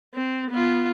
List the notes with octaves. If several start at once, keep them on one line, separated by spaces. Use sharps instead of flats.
C4
B3 F4